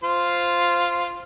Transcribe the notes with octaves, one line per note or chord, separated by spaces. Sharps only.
F4 C5